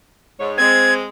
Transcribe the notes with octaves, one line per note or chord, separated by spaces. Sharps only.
G#2 C#5
G#3 C4 G#6